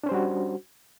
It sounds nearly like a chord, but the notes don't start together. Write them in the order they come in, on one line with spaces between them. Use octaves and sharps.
D4 C#4 C5 G3 F#4